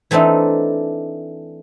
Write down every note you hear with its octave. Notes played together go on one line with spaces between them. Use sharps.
E3 A3 C4 D4 D#4